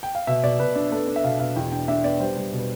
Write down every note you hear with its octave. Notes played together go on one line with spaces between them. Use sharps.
G5
F5
B2 E5
B2 D5
B2 B4
D4
B3 A4
D4
E5
B2 F5
B2 F5
E2 G5
D4 G5
D4 E5
B3 D5
G3 C5
G3
B2
B4